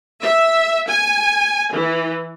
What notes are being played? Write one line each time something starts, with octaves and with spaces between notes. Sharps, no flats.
E5
G#5
E3